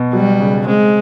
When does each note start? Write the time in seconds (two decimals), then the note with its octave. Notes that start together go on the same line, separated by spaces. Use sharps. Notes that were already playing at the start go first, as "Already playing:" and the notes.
Already playing: B2
0.13 F#3 G3
0.40 C#3
0.67 G#3 C4